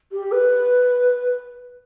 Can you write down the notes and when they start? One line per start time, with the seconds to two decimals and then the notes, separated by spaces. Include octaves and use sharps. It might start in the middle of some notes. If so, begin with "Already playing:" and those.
0.12 G4
0.31 B4